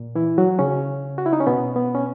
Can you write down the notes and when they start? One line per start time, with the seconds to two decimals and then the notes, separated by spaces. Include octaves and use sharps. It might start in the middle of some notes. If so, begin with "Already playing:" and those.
Already playing: A#2
0.15 E3 E4
0.38 F#3 F#4
0.59 C#3 C#4
1.18 F#4
1.26 E4
1.33 D#4
1.40 C#4
1.47 B2 B3
1.76 B3
1.95 C#4